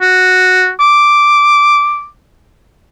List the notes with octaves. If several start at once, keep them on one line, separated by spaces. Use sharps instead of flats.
F#4
D6